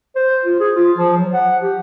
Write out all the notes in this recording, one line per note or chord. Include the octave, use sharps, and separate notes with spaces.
C5
F4
G#4
F4
F3
F#3
F#5
G4